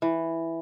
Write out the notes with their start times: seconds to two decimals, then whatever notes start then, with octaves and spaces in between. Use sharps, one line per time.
0.02 E3